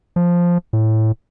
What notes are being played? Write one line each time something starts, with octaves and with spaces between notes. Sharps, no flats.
F3
A2